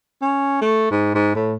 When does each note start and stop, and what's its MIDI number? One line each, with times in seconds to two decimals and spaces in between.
0.21 0.60 61
0.61 0.89 57
0.91 1.12 44
1.15 1.33 44
1.35 1.56 45